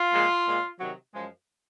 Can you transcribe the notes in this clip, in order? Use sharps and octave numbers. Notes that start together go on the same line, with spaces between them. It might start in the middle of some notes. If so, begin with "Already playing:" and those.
Already playing: F4
A#2 F3 G#3
A#2 G#3
C3 D#3 F#3
F#2 F3 G#3